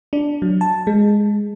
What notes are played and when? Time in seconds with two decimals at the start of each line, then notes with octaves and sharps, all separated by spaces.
0.13 D4
0.42 F#3
0.61 A5
0.87 G#3